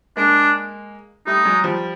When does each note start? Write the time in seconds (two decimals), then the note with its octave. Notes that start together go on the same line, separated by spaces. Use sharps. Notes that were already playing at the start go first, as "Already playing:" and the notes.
0.17 G#3 A#3 D4
1.26 G3 A3 D#4
1.45 F#3 G#3
1.64 F3 G3